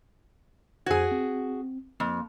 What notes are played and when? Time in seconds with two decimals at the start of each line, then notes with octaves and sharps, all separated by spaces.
0.86 F2 F#4 G#4 C5 G#6
1.11 C4
2.00 F2 A#3